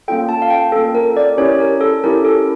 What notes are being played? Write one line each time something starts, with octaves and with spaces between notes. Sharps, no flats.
A#3 C#4 F4 A4 G5
A5
F5
G5
A#3 C#4 F4 A4
A#4
D5
C#4 E4 G4 C#5
A#4
A4
C#4 E4 G4 A#4
A4